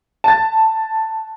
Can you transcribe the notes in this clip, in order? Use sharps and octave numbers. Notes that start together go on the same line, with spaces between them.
A5 A6